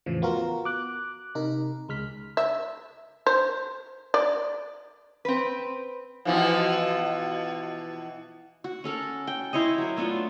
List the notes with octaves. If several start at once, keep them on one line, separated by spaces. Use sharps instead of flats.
E2 A2 C#3 E3 F3
B3 F4 F#4 A#4
D6 F#6
C3 D#4 A#4
C#2 G#3 F6 B6
E5
C5
D5
C4 B4
B2 E3 F3
F#4
C#4 A4 A#4
G5
E4 C5 C#5 D#5
F#3 A#4
A3 B3 D4 F4